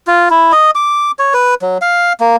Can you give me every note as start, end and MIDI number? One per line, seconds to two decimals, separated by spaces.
0.07 0.29 65
0.30 0.52 64
0.52 0.71 75
0.75 1.11 86
1.19 1.34 73
1.34 1.55 71
1.62 1.78 54
1.82 2.13 77
2.20 2.36 58